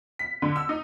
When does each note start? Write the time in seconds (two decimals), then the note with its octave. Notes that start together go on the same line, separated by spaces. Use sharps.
0.19 B6
0.42 D3
0.56 E6
0.69 D#4